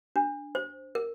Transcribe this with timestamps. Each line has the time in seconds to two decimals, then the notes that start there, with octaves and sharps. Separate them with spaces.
0.16 D4
0.55 C5
0.95 A#4